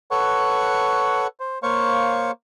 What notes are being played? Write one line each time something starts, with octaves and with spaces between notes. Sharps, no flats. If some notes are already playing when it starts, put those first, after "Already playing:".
A4 B4 C#5 F#5 C#6
C5
A#3 C5 C#5 F5 C#6